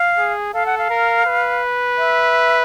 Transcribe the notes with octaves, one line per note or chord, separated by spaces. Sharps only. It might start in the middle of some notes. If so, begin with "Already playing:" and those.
Already playing: F5
G#4
A4 F5
F#5
F5
A#4
B4
E5